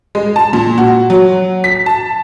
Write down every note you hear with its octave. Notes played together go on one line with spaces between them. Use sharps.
G#3
A5
A#2
F#4
F#3
B6
A5